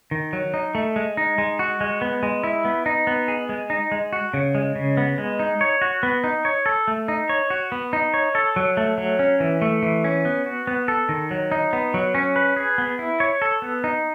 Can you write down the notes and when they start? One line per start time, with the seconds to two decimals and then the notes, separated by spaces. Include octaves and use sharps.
0.11 D#3
0.33 F#3
0.54 D#4
0.75 A3
0.96 G#3
1.17 D#4
1.38 G#3
1.59 F#4
1.81 G#3
2.01 B3
2.23 G#3
2.44 E4
2.65 B3
2.86 D#4
3.07 B3
3.28 G#4
3.49 G#3
3.70 D#4
3.92 G#3
4.13 F#4
4.34 C#3
4.55 G#3
4.76 C#3
4.97 B3
5.18 G#3
5.39 D#4
5.61 C#5
5.82 F#4
6.03 B3
6.24 D#4
6.45 C#5
6.66 A4
6.88 A3
7.08 D#4
7.29 C#5
7.50 F#4
7.72 B3
7.93 D#4
8.14 C#5
8.35 A4
8.56 F#3
8.77 A3
8.98 F#3
9.19 C#4
9.40 E3
9.62 A3
9.83 E3
10.04 C#4
10.25 B3
10.46 F#4
10.67 B3
10.88 A4
11.09 D#3
11.31 F#3
11.52 D#4
11.73 B3
11.94 F#3
12.15 C#4
12.36 B4
12.57 G#4
12.78 B3
12.99 E4
13.20 C#5
13.42 A4
13.62 B3
13.84 D#4